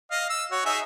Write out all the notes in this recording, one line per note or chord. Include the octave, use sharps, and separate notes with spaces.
D#5 F5
E6
F#4 C#5
D#4 G#4 E5